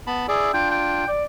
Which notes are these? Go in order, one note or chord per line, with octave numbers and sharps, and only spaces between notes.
B3 A5 B5
E4 G#4 D5
D4 F4 G5
G5
D5